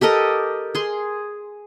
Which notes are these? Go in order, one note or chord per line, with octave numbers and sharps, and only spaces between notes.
G4 A4 A#4 D#5
G#4 C6